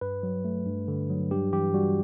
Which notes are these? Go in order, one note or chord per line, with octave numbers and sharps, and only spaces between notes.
G2 B4
F#3
A3
G2
D3
F#3
G2 G4
E3 G4
G3 F#4